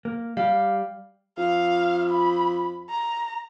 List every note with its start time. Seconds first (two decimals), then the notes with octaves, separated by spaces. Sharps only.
0.05 A#3
0.37 G3 G4 F5
1.38 F2 F5
2.10 B5
2.90 A#5